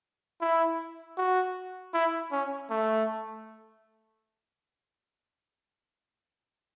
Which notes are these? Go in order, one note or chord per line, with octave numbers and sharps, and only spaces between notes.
E4
F#4
E4
C#4
A3